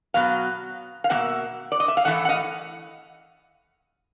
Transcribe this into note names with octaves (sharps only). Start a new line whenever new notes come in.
B2 F#3 B3 F5
F5
B2 G3 A#3 E5 F#5
D5
D#5
E5
F5
A2 E3 A3 E5 F#5
F#5
D#5 F5